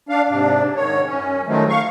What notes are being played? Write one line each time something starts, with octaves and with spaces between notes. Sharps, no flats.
D4 F5
G#2 C3 D4
G#2 D#3 C#5
F#2 C#4
D#3 F3 F#3 G#3 A3
F5 C#6